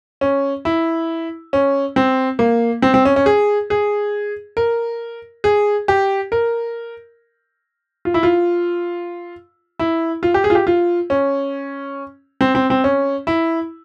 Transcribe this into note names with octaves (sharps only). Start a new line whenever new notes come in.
C#4
E4
C#4
C4
A#3
C4
C4
C#4
C#4
G#4
G#4
A#4
G#4
G4
A#4
F4
E4
F4
E4
F4
G4
G#4
F4
G4
F4
C#4
C4
C4
C4
C#4
E4